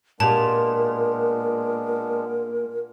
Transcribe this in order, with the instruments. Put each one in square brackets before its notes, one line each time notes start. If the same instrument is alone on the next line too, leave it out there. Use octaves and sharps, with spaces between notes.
[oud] A#2 [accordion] G#3 B3 D4 [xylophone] G4 A5 [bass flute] A#4